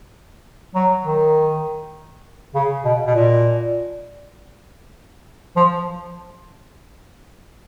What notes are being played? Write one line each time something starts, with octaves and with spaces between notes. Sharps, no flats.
F#3
D#3
C#3
B2
B2
A#2
F3